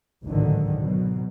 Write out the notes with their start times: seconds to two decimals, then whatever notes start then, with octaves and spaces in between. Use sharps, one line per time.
0.25 G#1 C#2 A2 D3 D#3 F#3
0.78 B2 F#3